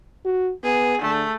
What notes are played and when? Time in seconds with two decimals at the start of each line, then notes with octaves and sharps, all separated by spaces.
0.25 F#4
0.63 B3 G#4
1.02 D3 A3